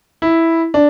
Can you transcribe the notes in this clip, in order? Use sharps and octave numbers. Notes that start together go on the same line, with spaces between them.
E4
D4